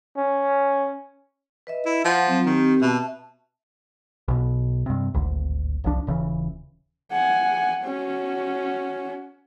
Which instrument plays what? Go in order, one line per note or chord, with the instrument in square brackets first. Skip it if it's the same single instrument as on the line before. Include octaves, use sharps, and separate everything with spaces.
[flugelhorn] C#4
[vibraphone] B4 D#5 E5
[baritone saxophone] E4
[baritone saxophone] F3 [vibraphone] F#5
[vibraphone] F#3 C4
[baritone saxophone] D#3 [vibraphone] C4 G4
[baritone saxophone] B2 [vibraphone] E5 A5
[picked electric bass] B1 B2
G2 C3
D1 G#1 D2
F#1 C2 F3 D4
D#1 C#3 E3
[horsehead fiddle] F#5 G#5
C#4 F#4